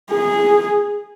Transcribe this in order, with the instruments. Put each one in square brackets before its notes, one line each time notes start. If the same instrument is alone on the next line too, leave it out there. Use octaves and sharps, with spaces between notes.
[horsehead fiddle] G#4